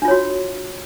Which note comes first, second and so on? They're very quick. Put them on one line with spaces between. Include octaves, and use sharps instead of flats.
D4 F4 C#5 F#4